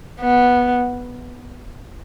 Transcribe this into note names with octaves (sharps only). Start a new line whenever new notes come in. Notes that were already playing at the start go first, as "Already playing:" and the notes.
B3